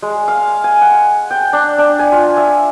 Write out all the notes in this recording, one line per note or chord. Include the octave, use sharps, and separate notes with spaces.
G#3
F5
G#5
F#5
G5
D4
D4
G#5
F4
E5